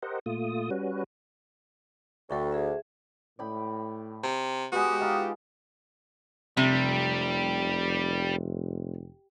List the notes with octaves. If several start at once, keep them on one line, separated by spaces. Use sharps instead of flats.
G4 A#4 C5 D#5 F#5
A#2 A3 F4 D#6
G3 C#4 F#4 B4
D2 A4 G5 C#6
G#4 E5
A2 D5 G5 B5
C3
G#3 B3 F#4 G4
D#4 F4
F1 C3 G3